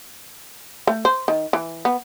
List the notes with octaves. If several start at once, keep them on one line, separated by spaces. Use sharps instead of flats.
A3
C5
D#3
E3
B3